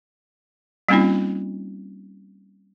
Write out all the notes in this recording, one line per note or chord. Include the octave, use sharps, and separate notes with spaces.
G3 A#3 C4 C#4 D#4 F4